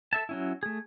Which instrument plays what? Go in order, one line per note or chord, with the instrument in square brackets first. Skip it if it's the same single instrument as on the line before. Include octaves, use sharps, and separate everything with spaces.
[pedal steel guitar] A4 E5 A5
F#3 C#4 E4
A3 G#4